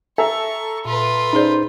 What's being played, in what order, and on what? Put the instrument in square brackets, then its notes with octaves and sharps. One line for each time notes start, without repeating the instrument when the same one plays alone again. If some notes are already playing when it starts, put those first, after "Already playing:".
[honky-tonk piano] A4 E5 A#5 [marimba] G#5 [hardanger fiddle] C#6
[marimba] A#2 [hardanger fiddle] F4 B4
[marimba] C#4 G#4 D5 [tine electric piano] D#4 C5